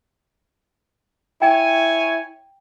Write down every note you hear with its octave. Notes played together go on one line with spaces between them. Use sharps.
E4 C#5 G5 G#5